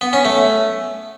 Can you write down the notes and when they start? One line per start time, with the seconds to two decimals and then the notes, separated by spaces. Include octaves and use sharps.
0.01 B3
0.13 C#4
0.25 A3